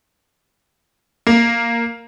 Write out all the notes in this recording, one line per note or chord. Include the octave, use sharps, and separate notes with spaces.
A#3